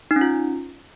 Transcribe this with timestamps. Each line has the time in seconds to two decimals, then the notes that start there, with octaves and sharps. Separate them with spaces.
0.11 D#4
0.16 C#4
0.21 F4